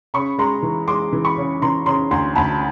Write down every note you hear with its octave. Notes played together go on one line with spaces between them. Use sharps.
C#3 B5 C#6
G#3 A#5 C6
E3
G#3 C6 D6
E3
B5 C#6
C#3
E3 A#5 C6
C#3 A#5 C6
D2 A#5 C6
D2 A5 B5